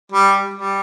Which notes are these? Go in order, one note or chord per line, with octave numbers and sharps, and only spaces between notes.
G3
G3